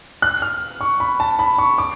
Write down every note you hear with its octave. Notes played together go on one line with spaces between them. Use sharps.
F#6
F6
C#6
B5
A5
B5
C#6
D6